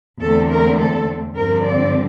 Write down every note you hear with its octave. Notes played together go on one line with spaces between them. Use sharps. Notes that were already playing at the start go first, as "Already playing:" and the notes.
E2 D3 A3 C4 A4
A#4
A4
G2 D3 F3 C4 A#4
D5